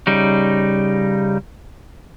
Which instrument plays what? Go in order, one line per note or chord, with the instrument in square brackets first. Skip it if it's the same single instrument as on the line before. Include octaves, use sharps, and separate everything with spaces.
[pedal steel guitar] C#3 G3 D#4